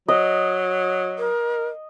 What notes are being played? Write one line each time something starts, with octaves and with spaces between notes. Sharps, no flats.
F#3 D#5
A#4